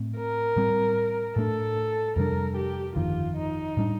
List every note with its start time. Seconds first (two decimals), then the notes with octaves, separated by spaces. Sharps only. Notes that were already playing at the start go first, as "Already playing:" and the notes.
Already playing: A2 A3 C4
0.17 A#4
0.56 A2 G3 C4
1.36 A2 A3 D4 A4
2.16 F2 C3 G3 D4 A#4
2.57 G4
2.96 G1 F2 D#3 F4
3.37 D#4
3.77 A2 G3 D4